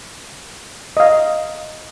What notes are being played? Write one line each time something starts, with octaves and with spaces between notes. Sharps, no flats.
D#5 F5